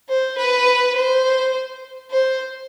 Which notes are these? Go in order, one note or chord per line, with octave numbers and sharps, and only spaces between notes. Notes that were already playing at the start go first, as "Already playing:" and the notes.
C5
B4
C5
C5